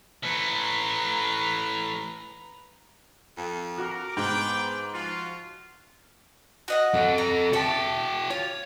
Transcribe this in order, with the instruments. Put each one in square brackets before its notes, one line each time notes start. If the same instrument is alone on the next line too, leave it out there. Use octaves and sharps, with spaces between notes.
[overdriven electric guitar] E3 A3 [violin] B4 A#5
[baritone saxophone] F2
[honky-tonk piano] F#4 [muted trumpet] A#4 [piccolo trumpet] D6
[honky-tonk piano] G#2 [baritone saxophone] B3 [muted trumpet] G5
[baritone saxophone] F3 [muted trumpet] F4 [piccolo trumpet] F#4
[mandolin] F#4 D#5 F#5
[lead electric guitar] C4 A4
[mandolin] A#5
[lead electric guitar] F#4 G5 [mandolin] E5 A5
[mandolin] F4 [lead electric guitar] C#5